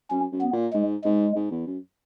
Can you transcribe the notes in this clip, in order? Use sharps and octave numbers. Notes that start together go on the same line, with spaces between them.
F#2 C#4
F#2
B3
A#2
G#2 G#3
G#2 G#3
G#2
E2
F#2